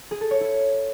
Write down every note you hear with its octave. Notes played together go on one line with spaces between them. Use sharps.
G#4
A4
C#5
E4